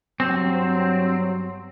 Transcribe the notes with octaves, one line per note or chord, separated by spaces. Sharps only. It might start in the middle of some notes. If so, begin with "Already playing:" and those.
G2 F#3 C4